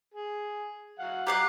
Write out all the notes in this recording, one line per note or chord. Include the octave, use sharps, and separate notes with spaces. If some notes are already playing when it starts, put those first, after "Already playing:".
G#4
F#3 F5 F#5
G4 F5 F#5 A#5 F#6